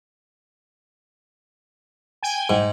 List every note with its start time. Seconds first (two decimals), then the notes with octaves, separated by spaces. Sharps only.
2.23 G5 G#5
2.50 G#2